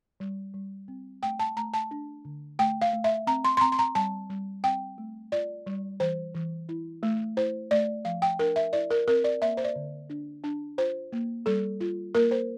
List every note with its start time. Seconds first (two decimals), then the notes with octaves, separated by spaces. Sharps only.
0.20 G3
0.54 G3
0.88 C4
1.22 A3 G5
1.39 A5
1.57 A3 A#5
1.74 A5
1.91 D4
2.25 D3
2.59 A3 G5
2.82 F5
2.93 A3
3.04 E5
3.27 C4 A#5
3.45 C6
3.57 C6
3.61 C4 A#5
3.72 C6
3.79 A#5
3.95 G3 A5
4.30 G3
4.64 C4 G5
4.98 A3
5.32 F4 D5
5.66 G3
6.00 E3 C5
6.34 E3
6.69 E4
7.03 A3
7.37 E4 C5
7.71 A3 D5
8.05 F3 F5
8.22 G5
8.39 D4 A#4
8.56 E5
8.73 E4 D5
8.91 A#4
9.08 C4 A#4
9.24 D5
9.42 A#3 E5
9.57 C5
9.64 D5
9.76 D3
10.10 D4
10.44 D4
10.78 F4 C5
11.12 A#3
11.46 G3 A4
11.80 F4
12.15 A#3 A#4
12.31 C5